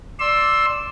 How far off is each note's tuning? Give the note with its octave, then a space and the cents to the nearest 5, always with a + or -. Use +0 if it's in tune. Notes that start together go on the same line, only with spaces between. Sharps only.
D5 +0 C6 +20 E6 +0